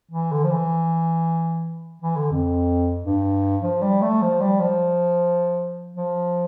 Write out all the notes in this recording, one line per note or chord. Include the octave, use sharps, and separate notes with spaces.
E3
D3
F3
E3
E3
D3
F2
G2
F3
G3
A3
F3
G3
F3
F3